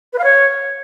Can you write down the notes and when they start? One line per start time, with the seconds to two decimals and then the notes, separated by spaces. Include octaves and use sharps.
0.13 B4
0.18 F5
0.24 C#5